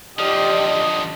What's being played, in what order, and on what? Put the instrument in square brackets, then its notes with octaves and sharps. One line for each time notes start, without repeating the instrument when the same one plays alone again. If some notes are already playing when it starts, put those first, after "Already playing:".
[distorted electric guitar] D3 F3 [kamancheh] G4 D5 [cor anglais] D#5